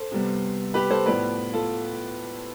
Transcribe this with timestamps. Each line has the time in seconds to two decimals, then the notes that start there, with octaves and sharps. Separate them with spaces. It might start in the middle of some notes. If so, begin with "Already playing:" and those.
Already playing: A4 C5
0.12 C3 G3 B3
0.74 G4 B4
0.90 A4 C5
1.06 A2 F3 B3 B4 D5
1.53 F4 A4